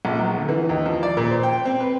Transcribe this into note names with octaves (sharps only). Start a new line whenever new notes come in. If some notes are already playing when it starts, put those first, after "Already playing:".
A#1
B1
D3
E3
D#2
F3
D5
A#2
C5
G5
C4
B4